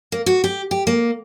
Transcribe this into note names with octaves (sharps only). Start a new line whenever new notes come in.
A#3
F#4
G4
G4
A#3